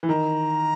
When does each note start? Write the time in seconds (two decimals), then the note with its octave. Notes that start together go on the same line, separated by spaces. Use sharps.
0.03 E3
0.09 D#3 A#5